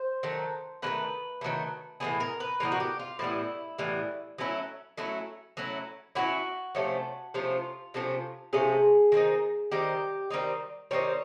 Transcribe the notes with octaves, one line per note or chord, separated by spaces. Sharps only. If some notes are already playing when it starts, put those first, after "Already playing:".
Already playing: C5
D#3 F#3 A3
D#3 F#3 A3 B4
D#3 F#3 A3
A2 E3 G3 B3 G#4
A#4
B4
A2 E3 G3 B3 A#4
F#4
G4
F4
A2 E3 G3 B3 E4
A2 E3 G3 B3
F#3 A3 C#4 E4
F#3 A3 C#4 E4
F#3 A3 C#4 E4
F#3 A3 C#4 E4 F#4
C3 F3 A3 C#4
C3 F3 A3 C#4 F4
C3 F3 A3 C#4
C3 F3 A3 C#4 G#4
D#3 G3 C4 D#4
D#3 G3 C4 D#4 G4
D#3 G3 C4 D#4
D#3 G3 C4 D#4 C#5